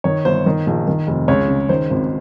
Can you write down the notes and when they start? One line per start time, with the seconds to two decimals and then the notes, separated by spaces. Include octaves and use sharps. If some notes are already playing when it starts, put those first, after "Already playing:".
0.04 D#3 C#5
0.25 G1 C5
0.46 D#3
0.67 A#1
0.87 D#3
1.07 F1
1.28 C#2 C#5
1.48 C#3
1.69 D#3 C5
1.90 G#1